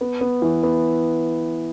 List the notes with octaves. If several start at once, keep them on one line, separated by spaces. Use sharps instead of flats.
B3
B3
E3
B3